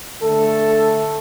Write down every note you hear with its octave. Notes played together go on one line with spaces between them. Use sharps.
D3 A3 A4